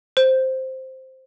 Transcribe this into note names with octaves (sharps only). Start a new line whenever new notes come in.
C5